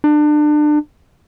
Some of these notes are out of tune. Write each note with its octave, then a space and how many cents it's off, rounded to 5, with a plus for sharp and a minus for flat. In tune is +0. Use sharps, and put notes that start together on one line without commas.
D4 +30